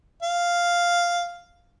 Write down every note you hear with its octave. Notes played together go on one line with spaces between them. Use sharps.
F5